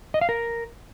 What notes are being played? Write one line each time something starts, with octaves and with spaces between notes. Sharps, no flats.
D#5
F5
A#4